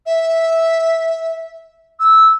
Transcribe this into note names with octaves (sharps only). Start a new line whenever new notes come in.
E5
E6